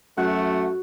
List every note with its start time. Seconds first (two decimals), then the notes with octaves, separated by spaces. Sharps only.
0.17 F#2 A3 F#4 F#5 F#6